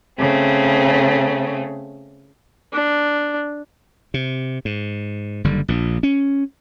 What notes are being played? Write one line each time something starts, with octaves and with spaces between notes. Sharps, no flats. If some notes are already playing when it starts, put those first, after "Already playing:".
C#3 A3 C4
D4
C3
G#2
F#1 D3 G3
A#1 A#2
C#4